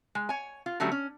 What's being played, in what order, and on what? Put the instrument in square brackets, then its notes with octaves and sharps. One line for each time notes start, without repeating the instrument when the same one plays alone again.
[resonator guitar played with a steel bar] G#3
C#5 G#5
F4
D3 F#3 G3 A3 C#4
C#4